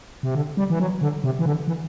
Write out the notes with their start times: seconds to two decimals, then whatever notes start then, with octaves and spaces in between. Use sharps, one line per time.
0.23 C3
0.35 D3
0.57 G3
0.70 E3
0.80 F#3
1.01 D3
1.24 C3
1.39 E3
1.46 D3
1.68 E3